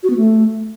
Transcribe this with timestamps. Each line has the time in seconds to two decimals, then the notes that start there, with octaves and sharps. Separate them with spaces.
0.03 F#4
0.10 B3
0.17 A3